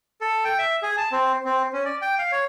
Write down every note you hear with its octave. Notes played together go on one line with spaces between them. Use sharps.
A4
G5
E5
G#4
A5
C4
C4
C#4
D5
G5
F5
C#5